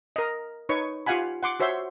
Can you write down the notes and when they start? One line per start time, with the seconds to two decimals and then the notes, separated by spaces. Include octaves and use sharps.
0.16 A#4 D#5
0.69 D#4 B4 C#5 C#6
1.06 F4 G4 F5 F#5 G#5 B5
1.43 F#5 C6 D6
1.60 F#4 C5 C#5 E5 C6